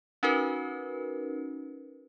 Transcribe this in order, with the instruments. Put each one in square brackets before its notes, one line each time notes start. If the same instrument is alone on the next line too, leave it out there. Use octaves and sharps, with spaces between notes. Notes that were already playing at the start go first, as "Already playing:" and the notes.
[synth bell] C#4 D#4 F#4 A#4 B4